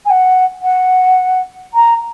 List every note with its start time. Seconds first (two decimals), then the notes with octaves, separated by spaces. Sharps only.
0.05 G#5
0.10 F#5
0.62 F#5
1.74 A#5